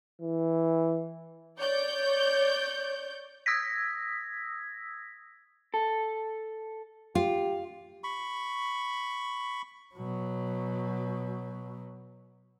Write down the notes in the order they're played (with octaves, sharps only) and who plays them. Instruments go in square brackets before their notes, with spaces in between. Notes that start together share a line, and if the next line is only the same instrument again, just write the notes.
[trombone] E3
[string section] C#5 D5 G6
[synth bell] D#6 E6 G#6 A#6 B6
[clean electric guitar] A4
[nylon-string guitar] F4 [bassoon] G4
[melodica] B5 C#6
[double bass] B2 F#3